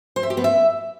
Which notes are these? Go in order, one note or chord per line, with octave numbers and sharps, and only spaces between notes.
C5
E5
G4
B3
E5